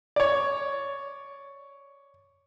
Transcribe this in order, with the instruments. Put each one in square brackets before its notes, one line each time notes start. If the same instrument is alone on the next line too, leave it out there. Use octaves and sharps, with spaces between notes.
[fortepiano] C#5 D5